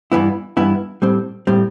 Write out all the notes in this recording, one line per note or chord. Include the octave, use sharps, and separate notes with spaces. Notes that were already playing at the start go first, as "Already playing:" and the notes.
G2 E3 B3 E4
G2 E3 B3 E4
A2 G3 C4
A2 G3 C4